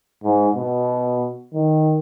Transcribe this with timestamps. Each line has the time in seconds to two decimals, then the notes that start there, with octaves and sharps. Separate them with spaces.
0.24 G#2
0.56 B2
1.54 D#3